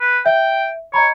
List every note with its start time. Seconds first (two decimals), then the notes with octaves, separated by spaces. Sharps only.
0.01 B4
0.26 E5 G5
0.94 C#5 D#5 A#5 B5